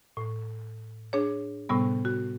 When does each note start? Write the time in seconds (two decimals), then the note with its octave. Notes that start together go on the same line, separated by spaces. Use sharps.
0.17 A2
1.13 D4 G#4 C#5
1.69 A2 C3 G3 B3
2.05 F#4